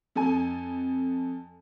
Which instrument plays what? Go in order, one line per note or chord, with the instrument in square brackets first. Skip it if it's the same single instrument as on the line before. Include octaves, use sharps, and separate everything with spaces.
[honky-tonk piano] F2 A4 G#5